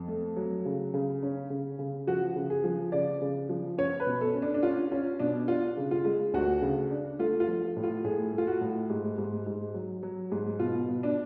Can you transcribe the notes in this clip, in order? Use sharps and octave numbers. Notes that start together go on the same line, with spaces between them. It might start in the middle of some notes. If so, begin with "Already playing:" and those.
Already playing: F2
A3
F#3
C#3
C#3
C#4
C#3
C#3
F3 F#4
C#3
G#4
F3
C#3 D5
C#3
F3
C#4 C#5
B4
B2
A4
C#4
D4
D4
C#4 F4
C#4 F4
B2 D4
D4 F4
C#3
F4
G#3
D2 F#4
C#3
D4
A3 F4
F4
F3
A2
F4
A2 G#4
A3
F4
F#4
A2
G#2
G#2
G#2
F#3
F#3
G#2
B2 F4
B2
D4